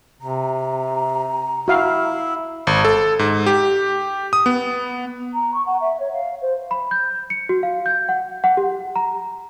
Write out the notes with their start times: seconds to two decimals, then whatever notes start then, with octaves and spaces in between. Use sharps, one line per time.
0.22 C3 A#5
1.68 E4 F#4 F5
2.67 G#1
2.85 A4
3.19 G#2
3.46 G4
4.33 D#6
4.46 B3
5.34 A#5
5.54 C#6
5.66 F#5
5.81 E5
6.00 C#5
6.14 F5
6.42 C5
6.71 B5
6.91 G6
7.30 C#7
7.49 F#4
7.63 F5
7.86 G6
8.09 F#5
8.44 F#5
8.57 G4
8.96 A#5